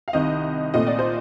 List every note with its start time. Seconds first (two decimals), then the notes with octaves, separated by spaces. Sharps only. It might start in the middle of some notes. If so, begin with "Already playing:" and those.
0.08 F5
0.13 C2 C3 D#3 D#5
0.74 A#2 A3 C4 D#5
0.87 D5
0.99 C5